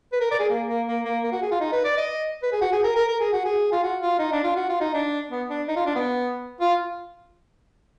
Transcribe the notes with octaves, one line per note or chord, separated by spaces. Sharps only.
B4
A#4
D5
G#4
A#3
A#3
A#3
A#3
A#3
F#4
G#4
F4
D#4
B4
D5
D#5
B4
G#4
F#4
G#4
A#4
A#4
A#4
G#4
F#4
G#4
F4
F#4
F4
D#4
D4
F4
F#4
F4
D#4
D4
B3
D4
D#4
F4
D4
B3
F4